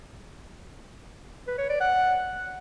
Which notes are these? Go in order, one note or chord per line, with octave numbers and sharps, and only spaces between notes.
B4
C#5
D5
F#5